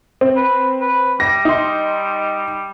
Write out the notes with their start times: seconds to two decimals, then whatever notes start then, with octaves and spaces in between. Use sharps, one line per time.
0.21 C4
0.36 B4
0.81 B4
1.20 G3 A#6
1.45 D#4 C6